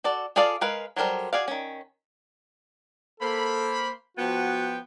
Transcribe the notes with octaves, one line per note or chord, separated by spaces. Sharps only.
F#4 A4 D5
F4 G#4 A4 D5 F5
G#3 A#4 B4 F5
F#3 G3 A4 A#4 C5
F#4 G#4 D5 F5
D#3 C#4
A#3 A4 C5 B5
F3 B3 F#4 G5